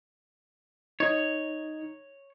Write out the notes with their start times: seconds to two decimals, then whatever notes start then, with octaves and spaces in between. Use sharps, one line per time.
1.00 D#4 C#5